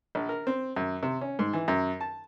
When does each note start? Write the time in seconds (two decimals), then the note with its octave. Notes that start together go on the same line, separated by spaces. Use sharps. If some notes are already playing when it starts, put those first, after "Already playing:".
0.15 A#1
0.29 A#4
0.47 C4
0.76 F#2
1.03 C3
1.21 C#4
1.39 G#2
1.53 E3
1.68 F#2
2.01 A5